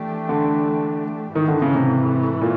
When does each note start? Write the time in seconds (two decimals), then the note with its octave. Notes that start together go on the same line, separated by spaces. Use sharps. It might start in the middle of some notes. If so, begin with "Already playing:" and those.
Already playing: E3 A3 D4 G4
0.29 D3
1.35 G#2 D#3 E3 A3
1.48 D3
1.62 C#3
1.75 C3
2.42 A#2